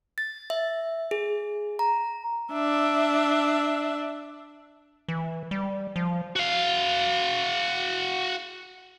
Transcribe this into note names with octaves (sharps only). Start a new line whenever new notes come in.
A6
E5
G#4
A#5
D4 E5
E3
G3
F3
F#4 F5